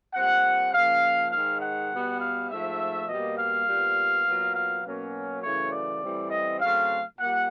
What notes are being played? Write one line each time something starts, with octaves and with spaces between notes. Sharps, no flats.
A#2 G3 C4 F#5
C#3 F3 A#3 C#4 F5
G#2 D#3 G#3 F5
F#5
B2 G3 B3
F5
G#2 F3 A3 E5
B2 G3 A#3 D#5
F5
A#2 G3 B3
A#2 F#3 B3
F5
B2 F#3 A#3 C#4
F#2 C#3 E3 A3 C#5
D5
A2 E3 G3 C4
D#5
C#3 F#3 A3 C4 F5
A#2 G3 A#3 F#5